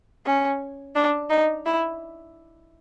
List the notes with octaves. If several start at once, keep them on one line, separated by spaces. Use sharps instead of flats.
C#4
D4
D#4
E4